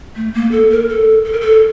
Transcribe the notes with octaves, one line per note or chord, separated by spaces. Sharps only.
A3
A#3
A4
A#4
A4
A4
A#4
A4